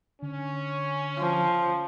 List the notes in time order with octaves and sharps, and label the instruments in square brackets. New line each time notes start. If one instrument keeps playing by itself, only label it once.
[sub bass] D3 [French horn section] C#4
[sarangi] F3